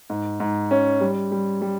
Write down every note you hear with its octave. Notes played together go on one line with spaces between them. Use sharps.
G#2
G#2
C#4
G3
G3
G3